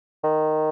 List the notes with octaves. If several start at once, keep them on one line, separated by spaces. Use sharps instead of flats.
D#3